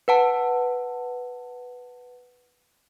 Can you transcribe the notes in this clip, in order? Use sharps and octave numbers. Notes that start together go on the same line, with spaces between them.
B4 F#5 A5